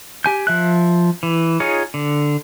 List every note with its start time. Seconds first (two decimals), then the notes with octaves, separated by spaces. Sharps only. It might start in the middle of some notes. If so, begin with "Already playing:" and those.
0.24 G4 G#5 G6
0.47 F3 E5 F#6
1.23 E3
1.60 D#4 F4 G#4 C#5
1.94 D3